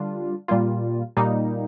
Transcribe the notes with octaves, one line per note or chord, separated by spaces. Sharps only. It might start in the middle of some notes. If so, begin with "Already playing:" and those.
Already playing: D3 G3 D4 F4
A#2 G3 A#3 F4
A#2 G3 A#3 D#4